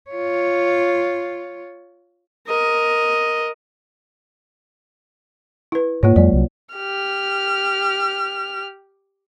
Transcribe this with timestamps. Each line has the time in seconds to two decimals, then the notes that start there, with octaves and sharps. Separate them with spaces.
0.10 F4 C#5
2.47 A#4 D#5
5.72 E4 B4
6.03 G#2 A#3 F4 C#5
6.16 F2 F#3 G#3 D5
6.33 C2 F#3
6.74 G4 F6